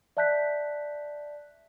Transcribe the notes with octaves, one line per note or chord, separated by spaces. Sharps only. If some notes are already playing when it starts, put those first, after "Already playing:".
D5 E5 A5 F#6 G6 B6